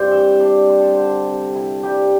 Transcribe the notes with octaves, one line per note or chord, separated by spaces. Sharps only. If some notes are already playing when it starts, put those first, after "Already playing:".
Already playing: G2 C4 G5 C6
E3 E5
D4 D5
D4 C5
A4
D3 C5
C3
C3 E4
G3 G4